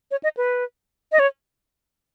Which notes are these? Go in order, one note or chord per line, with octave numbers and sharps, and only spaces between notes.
C#5
D#5
B4
D#5
C#5